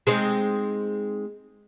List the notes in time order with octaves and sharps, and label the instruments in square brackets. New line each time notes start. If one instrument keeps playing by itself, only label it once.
[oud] G#3 C4 D#4